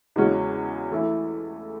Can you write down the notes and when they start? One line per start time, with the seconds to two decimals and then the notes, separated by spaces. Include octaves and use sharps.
0.16 E2 C#3 G#3 C#4 F#4
0.91 E3 A3 E4